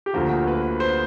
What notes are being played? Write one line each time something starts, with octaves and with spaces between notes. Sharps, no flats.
G4
D2 D3 F3 A#3 F#4
B4
C5